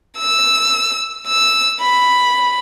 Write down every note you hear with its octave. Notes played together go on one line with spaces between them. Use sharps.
E6
E6
B5